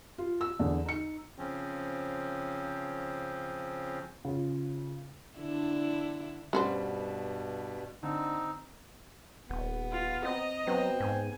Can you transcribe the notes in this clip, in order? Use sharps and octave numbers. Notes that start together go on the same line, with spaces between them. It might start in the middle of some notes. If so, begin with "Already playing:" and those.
F4
E6
E2 D3
D#4 C#7
C#3 F3 C4 C#4
C#3 F4
D3 D4 E4
G2 B2 G3 C#4 F#4 C5
D3 C4 D#4
D#1 B3
F4
C4 D#5 A#5
F#3 B3 C4
G#2 G#5